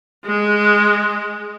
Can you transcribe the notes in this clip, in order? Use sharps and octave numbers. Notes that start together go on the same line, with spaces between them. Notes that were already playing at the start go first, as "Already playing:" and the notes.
G#3